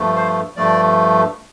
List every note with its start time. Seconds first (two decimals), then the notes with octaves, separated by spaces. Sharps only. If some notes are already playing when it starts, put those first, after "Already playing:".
Already playing: G2 F3 A3
0.15 C5
0.56 G2 F3 A3 D5